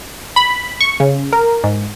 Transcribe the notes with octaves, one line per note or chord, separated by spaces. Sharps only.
B5
C#6
C#3
A#4
G#2